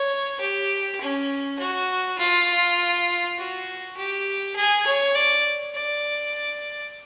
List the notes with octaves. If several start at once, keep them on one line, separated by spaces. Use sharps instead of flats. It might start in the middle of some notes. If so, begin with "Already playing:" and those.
Already playing: C#5
G4
C#4
F#4
F4
F#4
G4
G#4
C#5
D5
D5